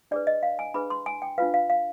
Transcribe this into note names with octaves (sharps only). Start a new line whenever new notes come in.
D4 G#4 B4 D5
D#5
F5
G#5
D4 G#4 B4 B5
C6
G#5
G5
D4 F4 B4 F5
F5
F5